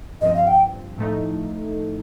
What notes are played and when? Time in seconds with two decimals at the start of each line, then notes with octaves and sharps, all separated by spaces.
0.21 G2 F3 C4 D#5
0.34 F5
0.47 G5
0.98 A2 F3 A3 D#4